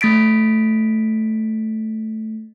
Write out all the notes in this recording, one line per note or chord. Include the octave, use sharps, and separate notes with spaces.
A3 A6 B6 D7